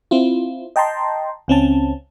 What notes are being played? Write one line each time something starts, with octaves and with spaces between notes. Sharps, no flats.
C4 E4 F4
D#5 G5 A5 A#5 C6
C#2 C4 C#4 A5